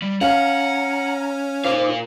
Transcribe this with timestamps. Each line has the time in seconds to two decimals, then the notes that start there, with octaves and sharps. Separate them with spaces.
0.02 G3
0.21 C#4 F5 F#5 A#5
1.64 A#2 D#4 C5 F5 D6